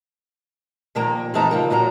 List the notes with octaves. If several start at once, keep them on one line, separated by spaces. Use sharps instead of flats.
A#2 D#3 F3 A#3 A#5
F2 E3 C4 D#4 A5 A#5
C#3 F3 A#3
D2 A#2 F#3 A#5